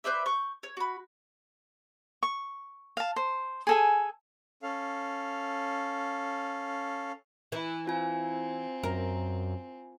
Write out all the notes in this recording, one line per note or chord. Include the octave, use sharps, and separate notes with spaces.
B4 C5 D5 E5
C#6 G6
C#5
F#4 B5
C#6
F5 A5
C5
G#4 A4 G#5
C#4 A4 F5
E3 E4
C4 F4 G#5
F#2 A#4